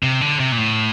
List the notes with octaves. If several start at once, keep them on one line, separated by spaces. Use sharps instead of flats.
C3
D3
C3
A#2
A2